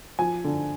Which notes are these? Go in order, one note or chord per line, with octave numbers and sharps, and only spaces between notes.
F3 G#5
D3